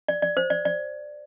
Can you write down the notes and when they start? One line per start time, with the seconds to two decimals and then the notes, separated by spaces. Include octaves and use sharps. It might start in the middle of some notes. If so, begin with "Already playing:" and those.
0.08 D5
0.22 D5
0.37 C5
0.50 D5
0.65 D5